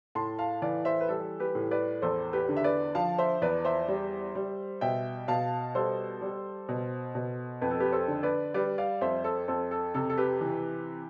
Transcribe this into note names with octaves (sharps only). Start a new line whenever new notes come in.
A2 A5 C6
F5 A5
E3 D5 F5
C5 E5
B4
G3 A4
G4 B4
A2
B4 D5
E2 A4 C5
G4 B4
D3
E5
B4 D5
F3 F5 A5
C5 E5
E2 B4 D5
C5 E5
G3
G3
B2 E5 G5
B2 F5 A5
G3 A4 C5
G3
B2
B2
F2 B4
A4
G4 B4
A4 C5
D3
B4 D5
G3 B4 D5
D5 F5
F2 C5 E5
A4 C5
F2 A4 C5
A4
C3 A4
A4
G4 B4
E3